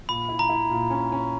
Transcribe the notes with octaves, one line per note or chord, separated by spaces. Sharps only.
A#2 B5
E4
A#5
E4
A#2
C#4
C#4